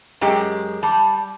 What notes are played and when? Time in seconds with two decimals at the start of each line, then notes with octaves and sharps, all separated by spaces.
0.21 F#2 G#3 G4
0.83 G3 A5